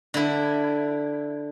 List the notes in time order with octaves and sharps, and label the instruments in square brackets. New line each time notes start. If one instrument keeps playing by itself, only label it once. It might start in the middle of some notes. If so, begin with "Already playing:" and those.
[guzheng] D3 E4